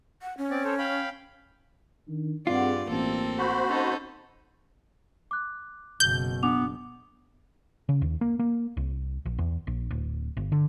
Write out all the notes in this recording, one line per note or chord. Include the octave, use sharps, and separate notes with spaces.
F#5
C#4
C4 D5
A4 C5 C#5
F5 G5 B5
D#3 D4
G2 C4 F4 G#4 D5 F#5
A1 A#3 C4 A4
F#4 C5 B5
C#4 D#4 A4
D6 F#6
F#1 B2 G6
B3 D4 D6 F7
C#3
D#2
A#3
A#3
C2
A#1
E2
A#1
D1
G1
D3